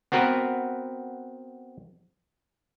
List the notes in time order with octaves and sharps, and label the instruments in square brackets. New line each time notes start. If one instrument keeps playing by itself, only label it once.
[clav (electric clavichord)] B3 C4 F#4 A#4 B4